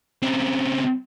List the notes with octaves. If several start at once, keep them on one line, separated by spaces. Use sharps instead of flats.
C#3 C4